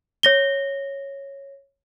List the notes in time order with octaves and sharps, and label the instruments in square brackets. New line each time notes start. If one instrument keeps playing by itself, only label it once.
[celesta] C#5 A#6 G7